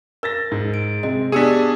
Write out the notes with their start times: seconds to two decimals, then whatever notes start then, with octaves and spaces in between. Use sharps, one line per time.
0.23 A#4 E6 A6 A#6
0.52 G#2
0.74 D7
1.03 C3 G#3 D#5
1.32 B3 D4 G4 G#4 E6 B6 C#7 D#7